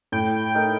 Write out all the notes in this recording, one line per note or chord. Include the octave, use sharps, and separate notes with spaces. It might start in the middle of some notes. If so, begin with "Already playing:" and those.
A2 G5
A3 D#4 A#4